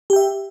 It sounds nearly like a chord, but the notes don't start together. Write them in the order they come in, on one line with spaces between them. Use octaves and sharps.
G4 G5 E5